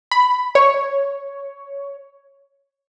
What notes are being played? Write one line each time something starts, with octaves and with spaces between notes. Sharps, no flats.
B5
C#5